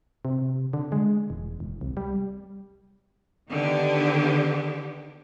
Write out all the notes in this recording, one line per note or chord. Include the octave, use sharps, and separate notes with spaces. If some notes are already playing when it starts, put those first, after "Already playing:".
C3
D3
G#3
E1
E1
C2
G3
D3 D#3 B3 G4